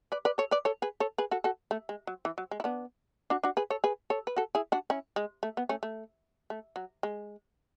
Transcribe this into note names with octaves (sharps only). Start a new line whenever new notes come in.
B4 D5
B4 D5
A4 C#5
B4 D5
A4 C#5
G#4 B4
A4 C#5
G#4 B4
F#4 A4
F#4 A4
A3
G#3
F#3
E3
F#3
G#3
E4
B3 D4
D4 F#4
D4 F#4
G#4 B4
A4 C#5
G#4 B4
A4 C#5
B4
F#4 A4
E4 G#4
D4 F#4
C#4 E4
G#3
A3
B3
A3 C#4
A3
A3
F#3
G#3